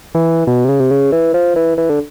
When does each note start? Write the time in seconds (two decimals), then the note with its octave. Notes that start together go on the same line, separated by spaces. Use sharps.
0.15 E3
0.47 B2
0.65 C3
0.69 C#3
0.80 C3
0.91 C#3
1.12 E3
1.34 F3
1.56 E3
1.78 E3
1.90 D3